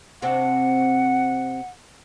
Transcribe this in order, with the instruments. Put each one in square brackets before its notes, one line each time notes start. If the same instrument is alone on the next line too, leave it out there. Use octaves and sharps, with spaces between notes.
[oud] C3 C4 D4 [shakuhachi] F#5